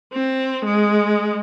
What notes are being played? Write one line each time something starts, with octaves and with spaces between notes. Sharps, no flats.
C4
G#3